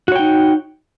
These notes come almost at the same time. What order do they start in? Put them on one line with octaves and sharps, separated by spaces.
F#4 C#5 G5 D#4